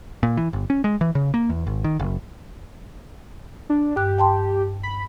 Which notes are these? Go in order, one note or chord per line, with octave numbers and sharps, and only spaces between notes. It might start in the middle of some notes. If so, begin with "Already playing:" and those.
A#2
E3
G1
C#4
G#3
E3
C#3
A#3
E2
G#1
D#3
F#1
D4
G2 G4 F#6
G5 A5 C6
B5